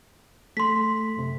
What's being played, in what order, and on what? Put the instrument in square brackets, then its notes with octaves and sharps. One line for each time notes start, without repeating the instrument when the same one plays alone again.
[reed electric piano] A3 A4 [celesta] C6 B6
[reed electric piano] F#2 C3